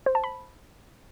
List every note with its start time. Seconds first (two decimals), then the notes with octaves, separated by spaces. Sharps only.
0.06 C5
0.15 A5
0.24 B5